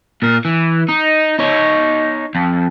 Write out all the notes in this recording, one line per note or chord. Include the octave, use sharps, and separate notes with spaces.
A#2 A#4
E3
D#4
D#4 C#5
F2